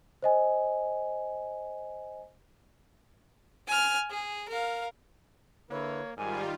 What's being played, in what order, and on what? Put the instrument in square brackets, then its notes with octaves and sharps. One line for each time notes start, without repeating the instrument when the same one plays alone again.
[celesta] C5 D#5 G#5
[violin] G#5 F6
G#4
A#4 F5
[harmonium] D3 E4 B4 [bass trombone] A#3 [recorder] C#5
[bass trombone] G#2 [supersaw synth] D#3 G3 F4 [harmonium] A#4 D5 [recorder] G#5